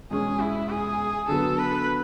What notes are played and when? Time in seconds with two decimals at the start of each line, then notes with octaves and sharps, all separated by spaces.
0.11 E2 B2 G#3 C#4 G#4
0.40 E4
0.70 G#4
1.28 D3 F#3 B3 A4
1.58 B4